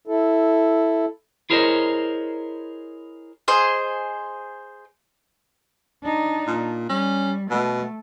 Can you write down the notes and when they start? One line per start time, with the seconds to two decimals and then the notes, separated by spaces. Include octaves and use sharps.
0.07 E4 A4
1.50 E4 G#4 A#4 C5 C#5 D#5
3.48 G#4 C5 D#5
6.03 D4 D#4
6.47 A#2
6.89 G3 C#4
7.51 B2 A3